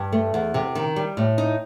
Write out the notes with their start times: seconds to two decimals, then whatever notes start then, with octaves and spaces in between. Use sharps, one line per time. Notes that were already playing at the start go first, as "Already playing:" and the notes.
Already playing: G2
0.13 A3
0.34 E2
0.54 C3
0.75 D#3
0.96 G3
1.17 A2
1.38 D#4